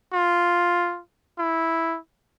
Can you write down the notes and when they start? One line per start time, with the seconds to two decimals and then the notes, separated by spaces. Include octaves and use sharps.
0.13 F4
1.39 E4